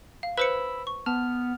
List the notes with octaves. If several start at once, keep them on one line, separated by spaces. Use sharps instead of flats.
F5
B4 C5 B5 E6 C#7
C#6
B3 A5 F6